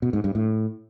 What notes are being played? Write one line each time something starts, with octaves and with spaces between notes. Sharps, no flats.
B2
G#2
G2
A2